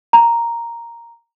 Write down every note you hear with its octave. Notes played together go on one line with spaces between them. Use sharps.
A#5